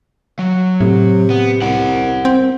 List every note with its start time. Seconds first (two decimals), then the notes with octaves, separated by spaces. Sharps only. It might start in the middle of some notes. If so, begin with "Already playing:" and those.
0.39 F#3
0.81 A2 C3
1.30 B3
1.62 C2 A#4 F#5
2.25 C4